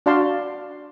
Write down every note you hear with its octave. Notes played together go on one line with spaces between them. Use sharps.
D4 F#4 D5 F5 A5 C6